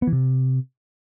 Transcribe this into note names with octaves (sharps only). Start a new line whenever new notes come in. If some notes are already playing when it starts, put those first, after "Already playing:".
B3
E3
C3